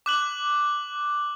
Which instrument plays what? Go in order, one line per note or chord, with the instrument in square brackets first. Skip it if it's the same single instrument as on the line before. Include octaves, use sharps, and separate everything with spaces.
[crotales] D6 F#6 F#7